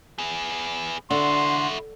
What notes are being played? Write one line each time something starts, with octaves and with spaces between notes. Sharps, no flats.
B3 G#4
D3 E4 F#4 C6